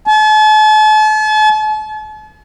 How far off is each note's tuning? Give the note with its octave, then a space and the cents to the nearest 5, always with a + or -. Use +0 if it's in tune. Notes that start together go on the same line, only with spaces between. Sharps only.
A5 -40